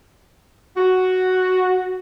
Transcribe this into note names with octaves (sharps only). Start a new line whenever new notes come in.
F#4